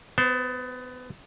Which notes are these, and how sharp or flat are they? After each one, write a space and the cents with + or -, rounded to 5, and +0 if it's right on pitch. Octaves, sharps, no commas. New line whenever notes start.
B3 +25 C5 +0